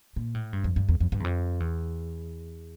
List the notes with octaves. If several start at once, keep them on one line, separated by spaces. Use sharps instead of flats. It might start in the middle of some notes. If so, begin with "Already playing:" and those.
A#2
A2
G2
F2
G2
E2
F2
G2
E2
F2
E2